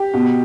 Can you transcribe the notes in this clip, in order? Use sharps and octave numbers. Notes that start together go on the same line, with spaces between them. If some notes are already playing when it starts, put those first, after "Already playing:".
Already playing: G4
B2